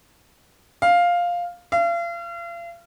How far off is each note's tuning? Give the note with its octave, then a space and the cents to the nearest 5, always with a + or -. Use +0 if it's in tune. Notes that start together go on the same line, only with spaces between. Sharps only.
F5 +5
F5 -40